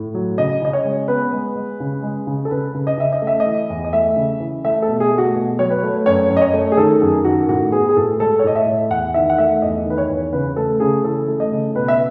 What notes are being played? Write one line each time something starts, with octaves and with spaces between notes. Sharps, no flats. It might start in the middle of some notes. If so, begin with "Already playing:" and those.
Already playing: A2
F#3
C#3 D#5
C#3 D#5
C#5
G#3
B3 B4
G#3
G#3
C#3
G#3
C#3
A4
C#3 B4
C#3
D#5
C#3 E5
D#5
A3
E5
D#5
E3
E2
D#5
A3 E5
C#3
E3
A3 E5
A4
B2
G#4
A3
F#4
B2
F#3 C#5
B4
A3
F#2 C#5
F#2
D#5
C#5
A3
G#4
D#3 A4
F#2 G#4
D#3 F#4
A2 F#4
B3 G#4
G#4
A2 A4
G#3 A4
C#5
A2 D#5
E5
A2
E2 F#5
D#3 E5
F#5
A3 E5
E2 D#5
D#3
B4
C#5
E2
C#3 B4
A3 A4
C#3 G#4
E3 A4
A3
D#5
C#3
B2 B4
E5